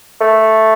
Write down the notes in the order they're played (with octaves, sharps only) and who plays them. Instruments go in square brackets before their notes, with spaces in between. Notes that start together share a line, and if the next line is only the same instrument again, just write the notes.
[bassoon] A3